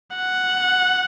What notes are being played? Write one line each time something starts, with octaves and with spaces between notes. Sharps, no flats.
F#5